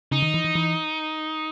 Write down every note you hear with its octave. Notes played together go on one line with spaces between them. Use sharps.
C#3 D#4
D#3
E3
E3
E3